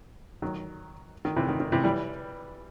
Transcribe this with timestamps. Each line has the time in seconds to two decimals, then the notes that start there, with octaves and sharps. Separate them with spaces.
0.42 D#3 F#3
1.25 D#3
1.36 C3 E3
1.49 D#3
1.60 D#3
1.72 C3 E3
1.84 E3 G3